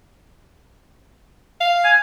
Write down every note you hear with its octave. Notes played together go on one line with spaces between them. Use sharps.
F5
G#5